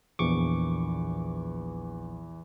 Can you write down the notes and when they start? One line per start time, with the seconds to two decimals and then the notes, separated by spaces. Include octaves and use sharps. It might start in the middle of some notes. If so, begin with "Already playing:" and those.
0.19 A#1 E2 C#6 D6